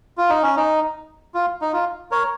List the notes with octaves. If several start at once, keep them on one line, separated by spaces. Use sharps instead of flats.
F4
D#4
C#4
D#4
F4
D#4
F4
A#4 C#5